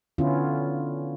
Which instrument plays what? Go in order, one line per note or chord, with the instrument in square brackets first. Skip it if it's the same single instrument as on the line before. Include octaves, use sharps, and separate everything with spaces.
[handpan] D3 B3 C#4 E4 F4